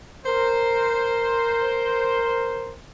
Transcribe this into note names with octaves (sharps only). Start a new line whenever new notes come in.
A#4 C5